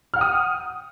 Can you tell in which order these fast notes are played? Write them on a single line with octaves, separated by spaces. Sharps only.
F6 F#5 G5 D#6